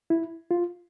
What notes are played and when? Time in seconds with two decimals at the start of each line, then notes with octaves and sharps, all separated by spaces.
0.10 E4
0.51 F4